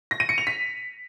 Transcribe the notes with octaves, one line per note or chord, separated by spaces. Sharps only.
A#6
D#7
C#7
F7
B6